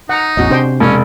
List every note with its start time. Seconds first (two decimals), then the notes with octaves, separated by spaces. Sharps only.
0.09 D#4 F#5 A#5
0.37 A1 E2 C#4 F#4 D#5
0.51 C3 D4 C5 G5
0.80 E1 C#4